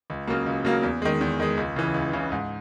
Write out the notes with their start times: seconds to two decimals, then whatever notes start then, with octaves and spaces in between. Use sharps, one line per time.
0.10 C#2
0.27 C#3 F#3 A#3
0.46 C#2
0.65 C#3 F#3 A#3
0.83 E2
1.02 D#3 G#3
1.21 E2
1.40 D#3 G#3
1.57 C#2
1.76 C#3 E3
1.94 C#2
2.13 C#3 E3
2.32 G#2